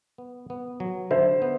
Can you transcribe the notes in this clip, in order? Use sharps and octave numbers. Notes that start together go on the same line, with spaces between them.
B3
B3
F#3
D3 C5 E5
B3